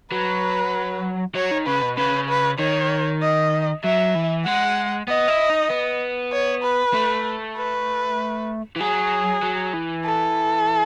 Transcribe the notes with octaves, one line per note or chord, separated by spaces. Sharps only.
F#3 B4
F#3 C#5
D#3
C#3 B4
B2
C#3 B4
B4
D#3 C#5
D#5
F#3 E5
E3
G#3 F#5
B3 D#5
E4
D#4
B3
C#5
B4
A3
B4
E3
F#3 G#4
F#3
E3
A4